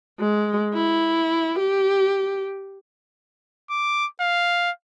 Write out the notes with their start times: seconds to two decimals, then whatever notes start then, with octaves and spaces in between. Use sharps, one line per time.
0.20 G#3
0.74 E4
1.59 G4
3.70 D6
4.21 F5